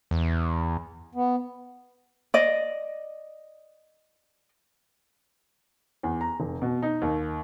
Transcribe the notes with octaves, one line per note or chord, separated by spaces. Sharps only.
E2
B3
D5 D#5
E2
A#5
F1
B2
D#4
D#2